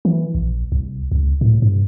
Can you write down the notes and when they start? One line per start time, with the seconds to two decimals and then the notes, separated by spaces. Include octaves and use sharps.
0.05 E3
0.35 A#1
0.72 C2
1.12 C#2
1.41 A2
1.62 G2